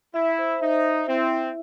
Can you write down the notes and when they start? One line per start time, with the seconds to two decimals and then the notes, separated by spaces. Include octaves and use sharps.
0.14 E4 E5
0.38 C5
0.61 D#4 E5
0.84 E5
1.08 C4 E4
1.31 E4